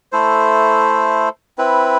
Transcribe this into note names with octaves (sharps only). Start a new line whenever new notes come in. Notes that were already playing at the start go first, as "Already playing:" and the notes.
A3 E4 A4 C5
C4 E4 B4